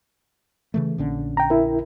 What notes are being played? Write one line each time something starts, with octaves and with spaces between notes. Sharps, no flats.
C#3 E3 A3
A#1 D3 C#4
G5 A#5
E4 A#4